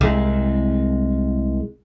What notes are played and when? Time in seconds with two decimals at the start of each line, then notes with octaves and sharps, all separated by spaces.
0.01 C2 G#3